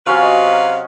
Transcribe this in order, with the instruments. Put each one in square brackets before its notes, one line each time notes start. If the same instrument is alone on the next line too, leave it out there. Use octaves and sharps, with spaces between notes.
[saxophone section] C3 B4 F5 [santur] F#3 C#4 F4
[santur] D#5